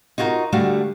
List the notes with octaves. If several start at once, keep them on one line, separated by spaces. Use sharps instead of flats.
D#4 F4 F#4 G#4 A#4
D3 G3 A3 F#4 F5